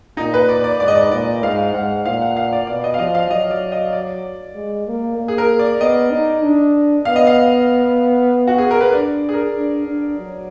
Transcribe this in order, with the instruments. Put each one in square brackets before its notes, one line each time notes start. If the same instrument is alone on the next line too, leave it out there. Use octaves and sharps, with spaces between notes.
[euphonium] A#2 [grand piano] D#4
[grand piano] B4
D5
D5
[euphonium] G#2 [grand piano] D5
[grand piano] D#5
D5
[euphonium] A#2 [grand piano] D5
[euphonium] G#2 [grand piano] F5
[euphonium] G#2 [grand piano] F#5
[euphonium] A#2 [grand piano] F5
[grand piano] F#5
F5
D5
[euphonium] B2 [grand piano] D5
[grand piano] D#5
F5
[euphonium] F3 [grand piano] D#5
[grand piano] F5
[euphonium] F#3 [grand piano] D#5
[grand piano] D5
D#5
D5
[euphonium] G#3
A#3
A#3
[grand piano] G#4
A#4
D5
[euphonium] B3 [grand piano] D#5
[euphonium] D#4
D4
[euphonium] B3 [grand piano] F5
[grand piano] D#5
F5
F#4
G#4
A#4
B4
[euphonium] D4 [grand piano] D5
[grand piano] G#4
A#4
[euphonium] D4
D4
F#3